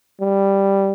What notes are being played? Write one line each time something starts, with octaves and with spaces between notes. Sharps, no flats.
G3